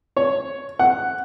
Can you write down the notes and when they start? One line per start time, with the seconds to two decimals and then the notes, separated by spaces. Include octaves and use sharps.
0.17 C#5
0.79 F#5